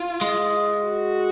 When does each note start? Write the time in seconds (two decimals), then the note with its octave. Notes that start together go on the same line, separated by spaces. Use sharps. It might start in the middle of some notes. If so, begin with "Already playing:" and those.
Already playing: F4
0.21 G#3
0.84 F#4